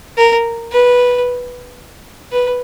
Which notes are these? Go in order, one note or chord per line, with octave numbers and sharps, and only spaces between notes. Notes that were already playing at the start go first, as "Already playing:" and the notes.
A#4
B4
B4